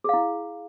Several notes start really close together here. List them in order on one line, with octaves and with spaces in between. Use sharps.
G#4 F5 E4